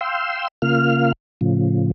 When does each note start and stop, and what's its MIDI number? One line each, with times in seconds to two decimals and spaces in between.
0.01 0.48 77
0.01 0.48 79
0.01 0.48 84
0.01 0.48 88
0.62 1.12 49
0.62 1.12 58
0.62 1.12 65
0.62 1.12 77
0.62 1.12 89
1.41 1.91 45
1.41 1.91 49
1.41 1.91 53